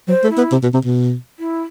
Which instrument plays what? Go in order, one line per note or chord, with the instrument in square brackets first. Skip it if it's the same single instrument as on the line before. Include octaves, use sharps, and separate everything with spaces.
[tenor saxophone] F#3 [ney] C5
[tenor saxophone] A3
[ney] E4
[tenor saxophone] B3
C3
B2
C3
B2
[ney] E4